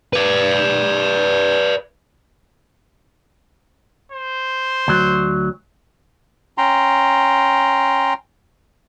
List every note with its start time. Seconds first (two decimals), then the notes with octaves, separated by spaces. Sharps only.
0.13 B4 D5
4.12 C5
4.88 D2 F#3
6.58 C#4 G5 A#5 C6